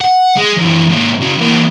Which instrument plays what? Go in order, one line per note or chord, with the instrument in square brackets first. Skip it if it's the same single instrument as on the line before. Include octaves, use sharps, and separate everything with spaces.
[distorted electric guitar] F#5
G#3
F#2 E3
G#2 A#3
C#3 F#3
E3 A#3